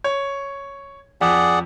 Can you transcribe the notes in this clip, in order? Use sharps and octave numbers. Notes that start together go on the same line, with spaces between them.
C#5
F2 G#4 D5 F#5